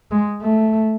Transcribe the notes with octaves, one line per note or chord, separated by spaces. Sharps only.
G#3
A3